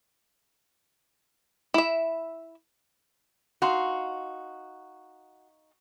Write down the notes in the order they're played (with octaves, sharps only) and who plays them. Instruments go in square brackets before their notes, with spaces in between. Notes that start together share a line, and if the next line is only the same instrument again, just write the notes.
[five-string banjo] E4 E5
[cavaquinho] D#4 F5 C6 [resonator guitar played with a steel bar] F#4